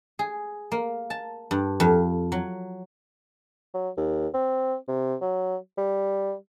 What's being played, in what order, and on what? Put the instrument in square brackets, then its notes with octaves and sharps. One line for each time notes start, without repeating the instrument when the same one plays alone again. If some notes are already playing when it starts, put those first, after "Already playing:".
[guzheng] G#4
A#3
A5
G2
F2
F#3
[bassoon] F#3
D#2
C4
C3
F#3
G3